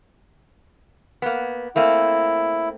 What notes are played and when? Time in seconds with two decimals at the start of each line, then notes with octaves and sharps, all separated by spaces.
1.22 A#3 B3
1.76 A3 A#3 C4 E4